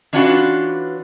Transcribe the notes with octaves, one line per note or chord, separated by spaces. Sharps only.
E3 C#4 D4 F4 F#4 B4